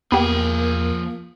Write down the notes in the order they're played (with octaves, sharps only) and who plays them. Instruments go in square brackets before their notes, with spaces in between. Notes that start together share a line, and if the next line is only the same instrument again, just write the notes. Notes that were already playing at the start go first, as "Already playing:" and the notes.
[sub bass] E2 [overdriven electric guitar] F3 G#4 [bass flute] A#3 [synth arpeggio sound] B3 G4